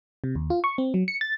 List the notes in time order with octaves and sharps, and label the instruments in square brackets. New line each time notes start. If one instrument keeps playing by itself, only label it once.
[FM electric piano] C3
D#2
F4
C#6
C4
F#3
C#7
A6